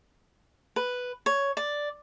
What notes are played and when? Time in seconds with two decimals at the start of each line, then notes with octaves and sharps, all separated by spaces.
0.76 B4
1.26 C#5
1.57 D5